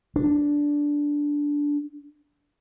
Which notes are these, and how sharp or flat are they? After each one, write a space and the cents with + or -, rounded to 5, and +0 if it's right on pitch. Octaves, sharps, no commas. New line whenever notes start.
D4 -10